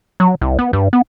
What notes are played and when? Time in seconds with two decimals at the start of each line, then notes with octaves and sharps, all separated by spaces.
0.20 F#3
0.41 C2
0.59 B3
0.73 G2
0.93 B3